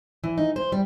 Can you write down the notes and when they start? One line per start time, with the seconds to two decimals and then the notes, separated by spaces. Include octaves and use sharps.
0.24 E3
0.38 D#4
0.56 C5
0.72 G3